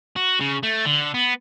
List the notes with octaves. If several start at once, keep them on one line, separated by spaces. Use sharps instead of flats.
F#4
C#3
A3
D3
B3